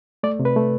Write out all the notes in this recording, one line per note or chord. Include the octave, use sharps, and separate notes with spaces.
A3 D5
C3
B4
A3